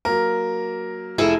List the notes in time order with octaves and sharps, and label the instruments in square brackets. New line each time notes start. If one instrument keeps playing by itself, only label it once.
[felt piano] F#3 A#3 [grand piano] A#4
[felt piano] F1 [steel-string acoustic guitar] E4 G#4 A4